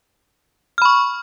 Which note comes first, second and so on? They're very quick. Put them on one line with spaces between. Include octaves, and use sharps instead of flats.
F6 B5 C#6